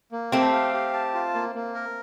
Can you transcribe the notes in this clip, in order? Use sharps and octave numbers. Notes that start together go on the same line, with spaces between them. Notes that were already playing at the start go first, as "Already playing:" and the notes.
A#3
A3 C4 G4
F5
G4
A5
F4
A#3
A#3
A#4